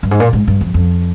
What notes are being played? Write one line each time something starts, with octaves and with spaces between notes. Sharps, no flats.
G2
G#2
A#2
G#2
G2
F2
F2